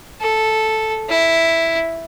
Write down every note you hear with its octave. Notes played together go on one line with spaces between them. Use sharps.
A4
E4